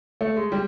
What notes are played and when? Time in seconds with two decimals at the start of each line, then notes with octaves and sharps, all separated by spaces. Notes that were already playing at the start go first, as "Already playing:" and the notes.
0.21 A3
0.37 G#3
0.52 G3